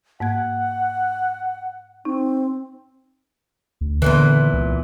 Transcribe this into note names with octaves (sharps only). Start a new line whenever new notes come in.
G#2 A#3 F#5 G#6
C4 D#4
D2
E2 A#2 D3 E3
C#2